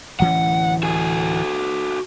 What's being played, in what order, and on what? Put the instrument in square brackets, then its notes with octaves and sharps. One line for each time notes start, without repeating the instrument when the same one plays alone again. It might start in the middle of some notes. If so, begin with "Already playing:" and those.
[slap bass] D1 E3 C#4 [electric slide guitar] F#5
[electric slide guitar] F#4 A4 G#5